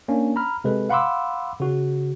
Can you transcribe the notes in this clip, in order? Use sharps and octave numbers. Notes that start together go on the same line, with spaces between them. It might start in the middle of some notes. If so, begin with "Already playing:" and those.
A#3 C#4 D4
A#5 B5 F6
C3 G#3 A4 B4
F5 F#5 B5 C6 D6 E6
C#3 F#4